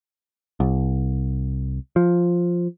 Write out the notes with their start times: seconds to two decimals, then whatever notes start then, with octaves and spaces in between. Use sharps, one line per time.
0.60 C2
1.96 F3